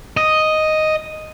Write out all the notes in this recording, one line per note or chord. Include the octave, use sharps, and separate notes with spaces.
D#5